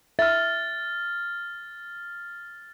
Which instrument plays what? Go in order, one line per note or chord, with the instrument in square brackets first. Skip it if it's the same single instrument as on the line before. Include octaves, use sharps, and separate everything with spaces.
[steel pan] E5 [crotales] F6 A6